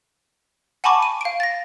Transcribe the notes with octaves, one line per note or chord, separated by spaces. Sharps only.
F#5 G#5 A5 B5 C#6 D6
D#7
F5 D7
A6 A#6